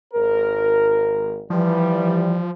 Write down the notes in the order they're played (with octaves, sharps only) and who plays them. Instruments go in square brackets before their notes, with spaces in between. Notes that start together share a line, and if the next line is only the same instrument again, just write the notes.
[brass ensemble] G#1 A#4
[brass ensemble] E3 G3 [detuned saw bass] F3